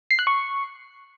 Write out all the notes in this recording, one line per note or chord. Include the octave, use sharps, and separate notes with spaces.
C7
F#6
C#6